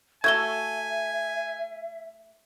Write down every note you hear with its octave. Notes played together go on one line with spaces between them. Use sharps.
A3 F#4 A4 E5 G#5 G#6 G7